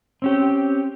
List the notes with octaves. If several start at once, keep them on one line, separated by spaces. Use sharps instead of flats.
C4 C#4 G4